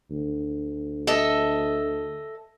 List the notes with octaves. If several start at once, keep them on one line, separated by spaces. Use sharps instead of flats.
D2
A4 D#5 E5